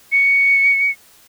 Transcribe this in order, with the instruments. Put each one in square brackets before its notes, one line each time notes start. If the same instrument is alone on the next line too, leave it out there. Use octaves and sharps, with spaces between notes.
[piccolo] C#7